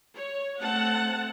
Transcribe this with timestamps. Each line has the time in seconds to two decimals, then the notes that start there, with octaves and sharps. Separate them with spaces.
0.17 C#5
0.61 A3 C4 F#5 A5